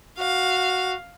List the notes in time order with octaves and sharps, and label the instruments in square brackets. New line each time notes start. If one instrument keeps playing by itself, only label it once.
[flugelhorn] F#4 [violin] F5